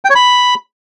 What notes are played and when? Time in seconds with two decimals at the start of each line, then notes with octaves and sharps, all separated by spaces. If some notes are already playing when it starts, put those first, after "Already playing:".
0.05 G5
0.10 C#5
0.15 B5